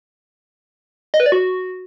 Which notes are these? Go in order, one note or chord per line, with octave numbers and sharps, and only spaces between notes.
D#5
B4
D5
F#4